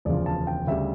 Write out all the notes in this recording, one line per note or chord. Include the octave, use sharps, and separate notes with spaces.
E1 D2 C#3 F3 D5
A5
G5
D2 C#3 G3 E5